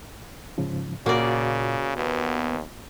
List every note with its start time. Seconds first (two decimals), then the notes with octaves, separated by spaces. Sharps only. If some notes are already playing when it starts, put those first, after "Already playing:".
0.58 G#2 C#3 F3
1.06 A#2 C#3 A#3 F#4 D5
1.97 D#2 B3